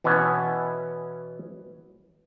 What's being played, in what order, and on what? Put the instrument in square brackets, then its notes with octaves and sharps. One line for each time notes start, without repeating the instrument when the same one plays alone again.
[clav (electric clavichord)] B2 E3 B3 C#4 E5